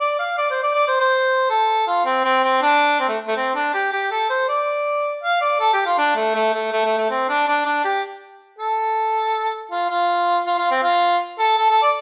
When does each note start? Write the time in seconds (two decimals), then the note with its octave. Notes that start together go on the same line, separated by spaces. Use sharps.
0.01 D5
0.19 F5
0.38 D5
0.50 C5
0.63 D5
0.75 D5
0.88 C5
1.00 C5
1.50 A4
1.87 F4
2.06 C4
2.25 C4
2.43 C4
2.62 D4
3.00 C4
3.09 A3
3.28 A3
3.37 C4
3.55 D4
3.74 G4
3.92 G4
4.11 A4
4.30 C5
4.49 D5
5.23 F5
5.42 D5
5.60 A4
5.73 G4
5.86 F4
5.98 D4
6.16 A3
6.35 A3
6.54 A3
6.72 A3
6.85 A3
6.98 A3
7.10 C4
7.29 D4
7.47 D4
7.66 D4
7.85 G4
8.59 A4
9.71 F4
9.90 F4
10.46 F4
10.58 F4
10.71 C4
10.83 F4
11.39 A4
11.58 A4
11.70 A4
11.83 D5